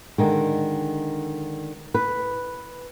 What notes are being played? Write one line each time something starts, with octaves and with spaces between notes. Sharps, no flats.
D3 D#3 G#3
B4